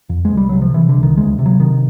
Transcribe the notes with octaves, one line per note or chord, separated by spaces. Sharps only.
F2
G#3
C2
G3
C3 F#3
F3
C3 E3
D3
C2
D#3
D2 G#3
C3
F#3
C3 D#3